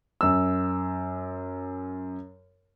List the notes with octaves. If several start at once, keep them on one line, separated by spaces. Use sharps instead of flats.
F#2 E6